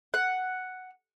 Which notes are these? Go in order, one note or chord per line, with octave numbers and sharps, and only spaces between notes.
F#5